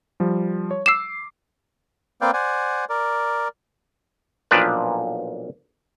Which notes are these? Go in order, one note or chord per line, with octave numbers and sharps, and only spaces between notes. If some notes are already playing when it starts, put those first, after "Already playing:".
F3 G3
C#5
D6 E6 C7 E7
A#3 C4 B4 D5 F5 G5
C5 D5 F#5 G#5
A#4 D5
B1 A#2 F3 D4 B4 D5